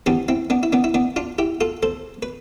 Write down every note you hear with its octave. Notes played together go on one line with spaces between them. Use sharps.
G2 E3 G3 B3 D4
C4 E4
B3 D4
E4
B3 D4
E4
B3 D4
D4 F4
E4 G4
F4 A4
A4 C5
B4